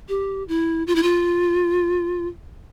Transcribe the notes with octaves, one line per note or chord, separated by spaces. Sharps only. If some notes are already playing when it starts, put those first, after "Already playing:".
G4
E4
F4
E4
F4